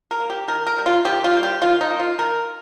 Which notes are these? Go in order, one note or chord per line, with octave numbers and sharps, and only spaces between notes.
A#4
A#3
G4
D#3 A#4
A#4
G3 A#3
F4
D#3 G4
F4
G3 A#3
G4
D#3 F4
D#4
A#3
F4
D#3 A#4